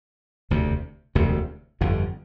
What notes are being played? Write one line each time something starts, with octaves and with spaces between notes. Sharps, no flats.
E1 D2 C3
E1 D2 C3
G1 F2 D3